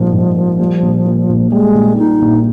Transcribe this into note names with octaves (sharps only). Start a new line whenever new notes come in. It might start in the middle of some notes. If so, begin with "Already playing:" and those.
Already playing: A#1 G#2 F3 G3 A#3
G#2
A#3
G3
A#1
A#2
A#1
G3 G#3
A#1
A#2 D#4
A#1